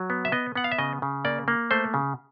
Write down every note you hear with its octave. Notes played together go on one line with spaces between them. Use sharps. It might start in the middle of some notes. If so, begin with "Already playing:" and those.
Already playing: F#3
B3
E5
B3 D#5
B3 F#5
F5
E5
C#3 D#5
C#3
A#3 D5
A#3
A3 C5
C#3